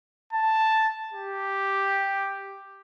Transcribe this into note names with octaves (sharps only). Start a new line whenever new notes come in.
A5
G4